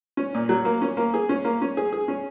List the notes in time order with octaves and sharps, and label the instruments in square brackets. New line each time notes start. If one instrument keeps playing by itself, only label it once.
[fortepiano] C#4
A#2
F#3
A#3
C#4
A#3
G#4
C#4
A#3
C#4
G#4
G#4
C#4